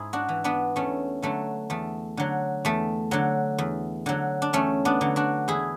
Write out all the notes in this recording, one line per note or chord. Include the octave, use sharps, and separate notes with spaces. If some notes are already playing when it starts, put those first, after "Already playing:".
Already playing: G#2 E4 G#4
D4 F#4
E3
B3 D4
E2 A3 C#4
D3 F#3 A3
E2 A3
D3 F#3
E2 A3
D3 F#3
E2
D3 F#3
D4
E2 A3 C#4
B3 D4
D3 F#3
D4 F#4
E2 E4 G#4